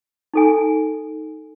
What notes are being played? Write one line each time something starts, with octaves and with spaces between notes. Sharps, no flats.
D#4 A4 G#5